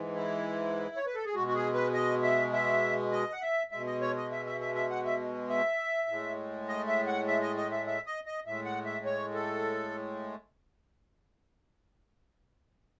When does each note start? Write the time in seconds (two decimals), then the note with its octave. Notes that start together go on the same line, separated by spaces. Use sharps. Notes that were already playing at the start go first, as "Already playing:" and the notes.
Already playing: G#2 E3 G#3
0.16 E4
0.96 C#5
1.06 B4
1.15 A4
1.25 G#4
1.35 B2 G#3 F#4
1.47 F#4
1.55 G#4
1.74 B4
1.94 D#5
2.23 E5
2.53 E5
3.12 D#5
3.32 F#5
3.42 E5
3.72 B2 G#3 E5
3.86 D#5
4.01 C#5
4.16 D#5
4.31 E5
4.46 E5
4.60 E5
4.75 E5
4.90 F#5
5.05 E5
5.49 E5
6.08 A2 G#3
6.68 D#5
6.87 E5
7.07 F#5
7.28 E5
7.42 D#5
7.57 D#5
7.72 E5
7.87 E5
8.06 D#5
8.26 D#5
8.46 A2 G#3 E5
8.65 F#5
8.85 E5
9.05 C#5
9.34 A4